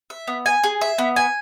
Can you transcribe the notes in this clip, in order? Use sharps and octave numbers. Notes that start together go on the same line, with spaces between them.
E5
B3
G#5
G#4
E5
B3
G#5